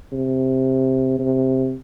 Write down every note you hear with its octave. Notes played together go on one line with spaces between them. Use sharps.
C3
C3